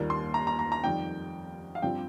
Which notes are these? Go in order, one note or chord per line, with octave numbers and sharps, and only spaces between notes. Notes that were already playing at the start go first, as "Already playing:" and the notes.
Already playing: D#2 D#3 G3 A#3 F4
C6
A#5
A#5
A#5
A#5
F2 D#3 G3 G5
F5
G2 F3 C4 F4 G5